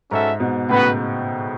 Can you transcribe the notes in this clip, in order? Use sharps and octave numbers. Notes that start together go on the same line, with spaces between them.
G#2 C#4 F#4 A4 E5
G#2 B2
A2 C#3 B3 F#4 B4